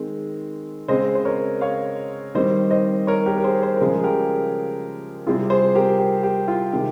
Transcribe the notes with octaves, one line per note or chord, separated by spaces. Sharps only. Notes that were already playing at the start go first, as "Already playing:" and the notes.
Already playing: D#3 G#3 C4
C#3 G#3 C4 C5 D#5
C5
A#4 C#5
C#5 F5
D#3 G3 C4 C5 D#5
C5 D#5
A#4 C#5
G4 A#4
A#4
G#4 C5
C5
C#3 F3 G#3 A#4
G#4
G4 A#4
C3 G3 C4 F4 G#4
G#4 C5
G4 A#4
G4
G4
F4
C3 D#3 G#3 G4